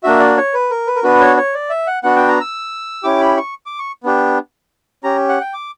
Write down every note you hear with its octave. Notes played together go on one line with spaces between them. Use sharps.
A#3 D4 F#4 E5
D5
C#5
B4
A#4
B4
A#4
B3 D4 F#4 B4
C#5
C#5
D5
E5
F#5
B3 D4 F#4 F#5
G5
A#5
E6
C#4 E4 G4 D6
B5
C#6
D6
C#6
B3 D4 G4
C#4 G4 A#5
F#5
G5
D6